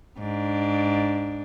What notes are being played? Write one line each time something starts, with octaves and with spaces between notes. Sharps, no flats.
G#2 D4